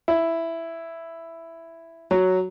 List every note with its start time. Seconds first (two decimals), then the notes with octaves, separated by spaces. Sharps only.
0.08 E4
2.11 F#3